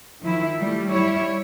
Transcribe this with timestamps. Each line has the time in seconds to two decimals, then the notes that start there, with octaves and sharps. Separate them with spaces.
0.21 D#3 F3 E4
0.60 G3 A3
0.90 G3 E4 C#5